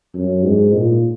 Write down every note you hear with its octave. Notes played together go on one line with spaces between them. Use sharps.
F#2
G#2
A#2